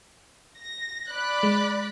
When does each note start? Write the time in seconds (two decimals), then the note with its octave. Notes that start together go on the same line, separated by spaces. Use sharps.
0.58 A#6
1.11 D5 B5 F#6
1.43 G#3